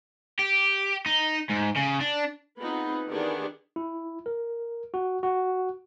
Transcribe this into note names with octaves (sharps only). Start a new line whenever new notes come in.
G4
D#4
G#2
C#3
D4
B3 C4 D#4 F4 G#4 B4
D#3 E3 B3 D4 G4 G#4
E4
A#4
F#4
F#4